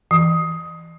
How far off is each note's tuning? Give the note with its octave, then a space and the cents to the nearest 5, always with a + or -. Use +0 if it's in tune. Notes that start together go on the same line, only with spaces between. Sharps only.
E3 -5